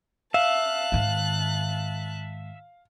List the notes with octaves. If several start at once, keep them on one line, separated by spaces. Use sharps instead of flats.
E5 F5 A5 F#6
G#2 D#3